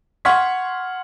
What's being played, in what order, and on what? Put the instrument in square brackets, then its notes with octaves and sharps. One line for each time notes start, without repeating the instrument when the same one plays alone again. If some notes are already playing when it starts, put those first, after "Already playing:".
[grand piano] F#5 C6 C#6 F6 G#6 B6